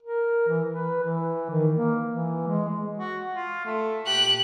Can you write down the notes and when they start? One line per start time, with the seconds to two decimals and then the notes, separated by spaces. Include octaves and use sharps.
0.03 A#4
0.48 E3
0.69 B4
1.03 E3
1.50 D#3
1.75 A#3
2.08 E3
2.47 G#3
2.98 F#4
3.32 F4
3.65 A3
4.06 A#2 G4 F#6